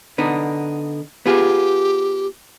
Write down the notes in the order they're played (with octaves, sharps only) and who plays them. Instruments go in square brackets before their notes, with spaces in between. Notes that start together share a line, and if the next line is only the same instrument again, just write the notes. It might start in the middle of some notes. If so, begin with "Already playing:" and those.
[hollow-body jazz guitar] D3 B3 D#4
[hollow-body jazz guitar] B3 F4 G#4 [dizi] G4